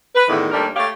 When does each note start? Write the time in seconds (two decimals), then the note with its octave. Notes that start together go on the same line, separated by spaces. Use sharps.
0.15 B4
0.28 E2 A2 D3 D#3
0.52 D#2 G3 A3 D4 A#4
0.76 A3 G4 C#5 F5